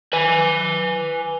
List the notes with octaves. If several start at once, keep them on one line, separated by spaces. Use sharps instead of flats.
B4 G#5